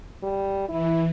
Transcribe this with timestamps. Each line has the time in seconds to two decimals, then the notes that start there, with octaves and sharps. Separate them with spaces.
0.23 G3
0.69 E3 E4